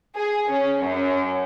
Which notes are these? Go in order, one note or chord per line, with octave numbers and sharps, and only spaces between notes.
G#4
C#4
F#2